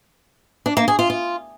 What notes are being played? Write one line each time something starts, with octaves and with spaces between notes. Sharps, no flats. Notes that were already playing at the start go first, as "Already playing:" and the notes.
D4
A#3
G#4
F4
F4